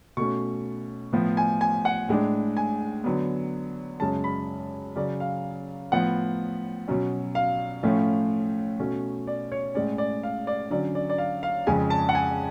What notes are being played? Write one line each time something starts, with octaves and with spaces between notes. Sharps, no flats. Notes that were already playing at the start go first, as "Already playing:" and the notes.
B2 A3 C#4 C#6
A2 F3 B3
G#5
G#5
F#5
A2 G#3 D4
G#5
D3 F#3 B3
F#2 C#3 G#3 C#4 A5
B5
C#3 F#3 C#4 D5
F5
A2 F3 B3 F#5
B2 F#3 C#4
F5
A2 F3 A3 C#4
B2 A3 C#4
D5
C#5
A2 G#3 C#4 D5
D5
F5
D5
D3 F#3 C#4 D5
D5
D5
F5
F5
F2 C#3 G#3 C#4 G#5
A5
F#5
G#5